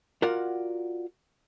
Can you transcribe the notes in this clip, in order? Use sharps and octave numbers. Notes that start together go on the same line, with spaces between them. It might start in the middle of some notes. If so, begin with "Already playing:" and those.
F4 F#4 A#4 D5 F#5